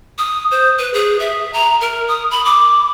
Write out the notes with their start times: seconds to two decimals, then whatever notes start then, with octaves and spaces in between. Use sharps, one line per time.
0.18 D#6
0.51 C5
0.79 B4
0.93 G#4
1.20 E5
1.53 A#5
1.81 A#4
2.08 D#6
2.31 B5
2.45 D6